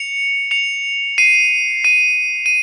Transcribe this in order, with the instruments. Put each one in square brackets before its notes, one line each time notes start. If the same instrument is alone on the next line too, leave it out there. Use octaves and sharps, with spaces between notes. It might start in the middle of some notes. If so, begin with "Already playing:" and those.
Already playing: [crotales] C#7 F7
C#7 F7
C7 D#7
C7 D#7
D#7